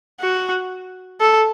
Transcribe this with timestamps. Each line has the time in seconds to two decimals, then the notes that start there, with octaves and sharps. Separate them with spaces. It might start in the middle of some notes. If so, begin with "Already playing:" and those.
0.21 F#4
1.21 A4